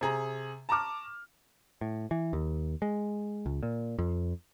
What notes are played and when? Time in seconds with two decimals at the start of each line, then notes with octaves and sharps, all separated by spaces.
0.01 C3 G#4 A#5
0.69 A5 A#5 C#6 D6 F6
1.81 A2
2.11 E3
2.33 D#2
2.82 G#3
3.46 C#2
3.63 A#2
3.99 F2